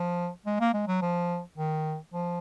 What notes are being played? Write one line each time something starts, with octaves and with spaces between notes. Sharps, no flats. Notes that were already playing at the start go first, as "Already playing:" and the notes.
Already playing: F3
G#3
A#3
G#3
F#3
F3
D#3
F3